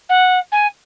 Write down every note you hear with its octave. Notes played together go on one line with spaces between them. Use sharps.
F#5
G#5